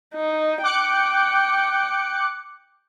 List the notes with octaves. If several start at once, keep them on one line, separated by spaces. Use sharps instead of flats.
D#4
G5 D6 F#6 C#7